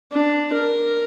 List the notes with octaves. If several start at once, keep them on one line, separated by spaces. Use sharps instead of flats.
D4
A#4